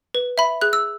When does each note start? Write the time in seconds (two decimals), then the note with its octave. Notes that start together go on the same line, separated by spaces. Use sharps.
0.15 B4
0.38 E5 B5
0.61 G#4 F#6
0.73 E6